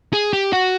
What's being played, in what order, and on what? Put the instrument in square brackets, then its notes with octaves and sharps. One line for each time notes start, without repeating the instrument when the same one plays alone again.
[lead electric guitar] G#4
G4
F#4